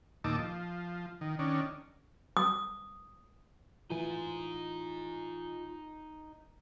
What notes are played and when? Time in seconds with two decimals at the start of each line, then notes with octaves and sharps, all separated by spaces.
0.24 D#2 A#2 D#4 A5 D6 E6
0.39 F3
1.21 D#3
1.39 D#3 C#4 D4
2.37 D#6
3.90 A2 E3 D#4 F4 G#5